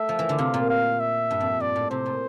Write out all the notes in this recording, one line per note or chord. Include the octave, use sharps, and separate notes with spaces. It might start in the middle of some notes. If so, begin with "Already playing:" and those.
Already playing: A3 E5
F3
E3
D3
C3 F5
A#2
F5
E5
G2
F2
G2 D5
A2
C3 C5
A#2